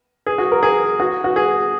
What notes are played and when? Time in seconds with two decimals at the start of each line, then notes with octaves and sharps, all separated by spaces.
0.27 G#4
0.38 F#4
0.52 A#4
0.63 G#4
1.00 F#4
1.24 F#4
1.36 G#4